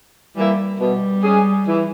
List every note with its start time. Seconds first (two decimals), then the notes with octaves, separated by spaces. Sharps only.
0.36 E3 G3 A#3 E4
0.80 B2 G3
1.24 G#3 C#4 G#4
1.68 E3